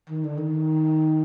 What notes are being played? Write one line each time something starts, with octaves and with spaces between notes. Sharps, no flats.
D#3
D3
D#3